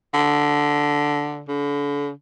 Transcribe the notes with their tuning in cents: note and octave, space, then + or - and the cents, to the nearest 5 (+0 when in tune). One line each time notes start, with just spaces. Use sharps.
D3 -5
D3 -40